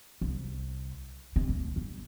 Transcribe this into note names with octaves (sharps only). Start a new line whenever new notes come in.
C2
C3
D2
G1